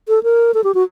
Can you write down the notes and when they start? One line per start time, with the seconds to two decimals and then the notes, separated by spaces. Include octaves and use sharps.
0.08 A4
0.23 A#4
0.54 A4
0.64 G4
0.74 F#4